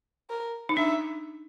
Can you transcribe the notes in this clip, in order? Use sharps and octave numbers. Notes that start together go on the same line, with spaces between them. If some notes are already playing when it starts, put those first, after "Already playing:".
A#4
D#4
D4 E5